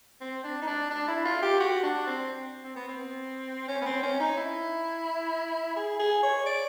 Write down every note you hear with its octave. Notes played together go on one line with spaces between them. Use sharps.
C4
D4
D#4
D4
D4
E4
F4
G4
F#4
D4
C4
C4
B3
C4
C#4
B3
C4
C#4
D#4
E4
G#4
G#4
C#5
D5